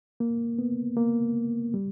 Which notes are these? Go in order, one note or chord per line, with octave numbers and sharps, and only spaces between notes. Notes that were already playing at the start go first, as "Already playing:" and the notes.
A#3
B3
A#3
G3